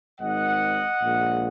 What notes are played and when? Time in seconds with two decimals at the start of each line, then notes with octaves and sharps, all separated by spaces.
0.21 G#1 G#2 D#3 D#5 F#5
1.02 A#1 A#2 G#3